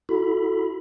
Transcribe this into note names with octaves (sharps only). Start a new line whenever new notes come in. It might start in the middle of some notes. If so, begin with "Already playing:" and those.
E4 F#4 A4 B5